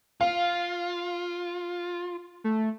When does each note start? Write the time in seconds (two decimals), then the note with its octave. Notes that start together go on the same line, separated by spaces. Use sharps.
0.21 F4 F5
2.44 A3